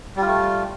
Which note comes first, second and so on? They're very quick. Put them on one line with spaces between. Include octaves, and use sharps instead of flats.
G3 F4 A3